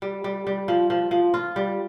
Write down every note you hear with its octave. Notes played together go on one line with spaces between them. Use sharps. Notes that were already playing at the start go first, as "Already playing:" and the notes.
G3
G3
G3
F3
F3
F3
F4
G3